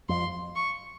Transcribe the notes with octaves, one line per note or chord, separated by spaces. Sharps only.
F2 C6
C#6